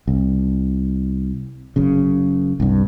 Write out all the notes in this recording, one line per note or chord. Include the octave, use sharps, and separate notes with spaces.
C2
F#1 F#2 C#3
C2 G2